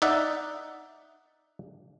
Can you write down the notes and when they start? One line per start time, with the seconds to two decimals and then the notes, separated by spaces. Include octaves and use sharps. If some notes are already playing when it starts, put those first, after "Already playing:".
0.02 D#4 D5 E5 F#5